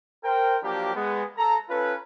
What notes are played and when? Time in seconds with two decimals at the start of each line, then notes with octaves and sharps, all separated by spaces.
0.24 A#4 C5 G5
0.63 F3 F#3 A#3 D4 G4
0.95 G#3 B3
1.37 A4 A#5
1.69 C#4 F4 A4 B4